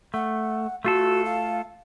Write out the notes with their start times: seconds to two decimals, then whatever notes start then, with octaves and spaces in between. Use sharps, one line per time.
0.14 A3 F#5
0.85 A3 F4 F#4 A4
1.25 F5